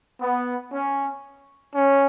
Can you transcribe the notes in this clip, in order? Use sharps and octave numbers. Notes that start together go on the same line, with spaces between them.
B3
C#4
C#4